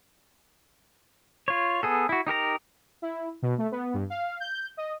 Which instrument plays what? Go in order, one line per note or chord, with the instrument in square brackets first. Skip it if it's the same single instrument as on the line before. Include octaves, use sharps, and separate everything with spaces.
[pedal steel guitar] F4 C#5
B3 G#4 A4
E4 F#4
D#4 G4 A#4 A#5
[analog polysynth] E4
B2
A3
B3
G2
F5
G6
D#5